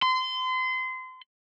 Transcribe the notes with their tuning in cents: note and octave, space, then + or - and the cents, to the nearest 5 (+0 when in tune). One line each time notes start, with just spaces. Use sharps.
C6 -30